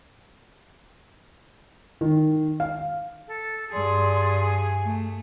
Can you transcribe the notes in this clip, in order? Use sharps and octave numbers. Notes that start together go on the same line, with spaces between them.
D#3
F5
A4
G2 G#4 D5 C6
G#5
A3